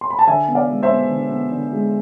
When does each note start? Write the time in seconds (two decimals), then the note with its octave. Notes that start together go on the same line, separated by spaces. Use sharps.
0.01 C6
0.10 B5
0.19 A5
0.27 D3 E5 G#5
0.48 B3
0.55 D5 F5
0.69 G#3
0.83 C5 E5
0.89 B3
1.10 D3
1.31 B3
1.51 D3
1.72 G#3